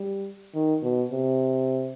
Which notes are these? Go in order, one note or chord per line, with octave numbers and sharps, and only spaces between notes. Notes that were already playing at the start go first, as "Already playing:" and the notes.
Already playing: G3
D#3
B2
C3